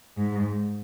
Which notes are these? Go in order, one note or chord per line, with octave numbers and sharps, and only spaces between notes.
G#2